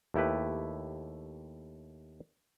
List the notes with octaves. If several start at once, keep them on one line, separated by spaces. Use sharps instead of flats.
D#2 A3 E4 G4 B4